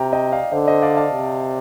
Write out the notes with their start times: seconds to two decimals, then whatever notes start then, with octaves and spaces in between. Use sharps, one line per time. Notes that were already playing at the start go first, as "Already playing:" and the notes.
Already playing: C3 G5 A#5
0.13 D#5 G5
0.32 D5 F5
0.52 D3 C5 D#5
0.67 C5 D#5
0.82 D5 F5
0.97 F5 A5
1.12 C3